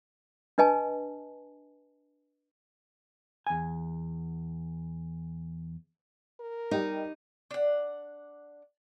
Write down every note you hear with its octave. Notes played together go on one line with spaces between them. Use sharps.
D4 B4 D#5 G#5 A5
E2 G#5
A#4
G3 D#4 G4 D#5
D4 F#5